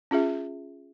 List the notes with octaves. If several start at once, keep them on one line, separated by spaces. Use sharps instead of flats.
C#4 F4 G#4 E5